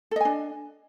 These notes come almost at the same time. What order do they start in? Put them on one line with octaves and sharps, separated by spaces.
A4 D#5 G#5 D4